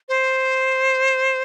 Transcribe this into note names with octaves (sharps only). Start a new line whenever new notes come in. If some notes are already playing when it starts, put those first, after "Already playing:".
C5